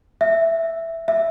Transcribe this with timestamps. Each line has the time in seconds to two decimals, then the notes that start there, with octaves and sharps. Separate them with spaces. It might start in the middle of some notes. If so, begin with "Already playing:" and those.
0.21 E5
1.08 E5